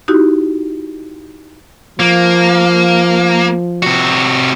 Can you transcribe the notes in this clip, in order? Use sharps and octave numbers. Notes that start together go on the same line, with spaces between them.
D#4 E4 F#4 G4
F3 A#3
C3 F#4